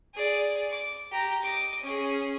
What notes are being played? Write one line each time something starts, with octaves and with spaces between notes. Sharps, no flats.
G#4 D5
D6
G4 A#5
D#5 D6
C#4 G#4